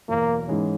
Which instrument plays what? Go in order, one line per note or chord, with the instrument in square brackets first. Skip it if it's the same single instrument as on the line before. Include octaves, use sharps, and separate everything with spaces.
[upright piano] E2 B2 F#3 [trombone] A#3
[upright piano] G#2 E3 G#3 C#4